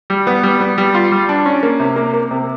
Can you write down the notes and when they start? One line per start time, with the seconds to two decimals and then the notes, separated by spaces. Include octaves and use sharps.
0.10 G3
0.27 B3
0.43 G3
0.61 B3
0.78 G3
0.95 F4
1.12 G3
1.29 D4
1.46 C#4
1.63 A#3
1.80 C3
1.96 A#3
2.13 A#3
2.31 C3